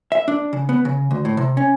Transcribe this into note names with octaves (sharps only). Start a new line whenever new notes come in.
E5
D4
C#3
B3
C#3
D2
A2
C3
C#4